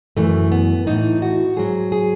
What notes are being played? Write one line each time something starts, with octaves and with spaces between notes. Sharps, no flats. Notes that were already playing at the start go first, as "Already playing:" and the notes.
F#2 E3 A3
B3
A2 E3 D#4
F#4
G#2 F#3 G#4
G#4